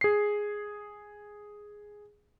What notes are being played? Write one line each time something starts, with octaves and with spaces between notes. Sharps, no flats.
G#4 C7